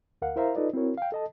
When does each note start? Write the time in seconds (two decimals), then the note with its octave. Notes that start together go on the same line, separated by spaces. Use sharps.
0.22 D2 A#4 F5 F#5
0.36 E4 A#4 C5 E5 F5 A#5
0.56 D#4 F4 A4 B4 D5 D#5
0.73 C4 E4 F#4 A#4 C#5
0.97 F5 G5
1.12 A4 D#5 A5